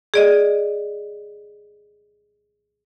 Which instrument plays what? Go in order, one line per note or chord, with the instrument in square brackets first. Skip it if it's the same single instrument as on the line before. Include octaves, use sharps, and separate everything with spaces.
[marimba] G#4 D5 D#5